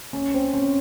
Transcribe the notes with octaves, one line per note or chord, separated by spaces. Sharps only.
C#4
C4
C#4